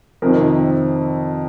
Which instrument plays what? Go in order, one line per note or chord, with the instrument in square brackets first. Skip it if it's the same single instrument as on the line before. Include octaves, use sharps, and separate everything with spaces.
[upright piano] F2 C3 D#3 A#4